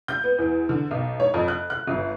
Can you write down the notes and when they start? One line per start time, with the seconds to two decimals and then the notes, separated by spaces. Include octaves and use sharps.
0.08 G6
0.24 B3
0.39 E2
0.69 D3
0.91 B1
1.20 C#5
1.34 F2
1.48 F#6
1.70 F#6
1.87 G1